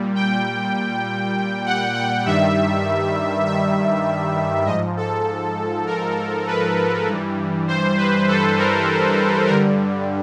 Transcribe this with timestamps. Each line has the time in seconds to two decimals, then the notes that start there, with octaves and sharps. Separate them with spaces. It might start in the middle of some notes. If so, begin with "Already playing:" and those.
Already playing: A#2 G3
0.15 G5
1.66 F#5
1.95 F#5
2.25 G2 D#3 G3 E5
3.46 E5
4.66 G#2 F3 D#5
4.97 A4
5.86 A#4
6.47 B4
7.07 G2 E3 G3
7.68 C5
7.97 B4
8.28 A4
8.58 A#4
9.47 G2 D3 G3 A#4